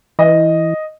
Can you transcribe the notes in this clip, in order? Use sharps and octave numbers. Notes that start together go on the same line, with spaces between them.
E3 D#5